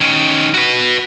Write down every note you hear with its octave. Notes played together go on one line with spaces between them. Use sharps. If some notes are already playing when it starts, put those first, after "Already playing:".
D#3 C#4
F#4 B4